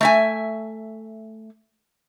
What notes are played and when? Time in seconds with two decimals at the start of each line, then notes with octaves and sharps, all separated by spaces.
0.01 A3 E5 G#5